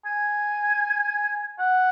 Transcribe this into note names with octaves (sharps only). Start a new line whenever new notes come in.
G#5
F#5